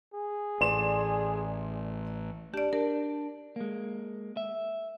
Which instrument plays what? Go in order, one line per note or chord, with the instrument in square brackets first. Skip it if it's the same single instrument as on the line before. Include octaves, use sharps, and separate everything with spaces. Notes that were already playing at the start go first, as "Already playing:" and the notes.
[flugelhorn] G#4
[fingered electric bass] A1 [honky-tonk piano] D5 C6 E7
[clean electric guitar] D4 [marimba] G4 D5
[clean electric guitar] D4 [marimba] A#4
[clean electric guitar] G#3 A#3
E5